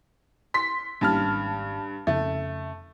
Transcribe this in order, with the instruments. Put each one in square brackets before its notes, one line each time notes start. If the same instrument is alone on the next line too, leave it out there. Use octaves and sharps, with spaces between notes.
[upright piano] C6 B6
[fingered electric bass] G#1 A#3 C#4 [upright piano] G2 A5 F6
[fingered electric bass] F2 C#3 [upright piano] A3